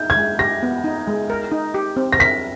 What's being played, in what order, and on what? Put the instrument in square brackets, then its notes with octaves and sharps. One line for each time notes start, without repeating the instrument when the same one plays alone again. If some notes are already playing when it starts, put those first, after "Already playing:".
Already playing: [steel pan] D#4 [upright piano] G6
[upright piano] G#6
[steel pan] G#3
[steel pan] G4 [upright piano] A#6
[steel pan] B3
D#4
G#3
A#4
D#4
G4
C4
[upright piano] A#6
[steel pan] A#4 [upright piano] B6